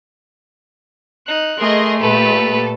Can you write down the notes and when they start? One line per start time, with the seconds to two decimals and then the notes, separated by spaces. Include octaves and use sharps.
1.27 D#4 F#6
1.59 A3 G#4 A#4 D#5 C6
2.00 A#2 G4 A4 B4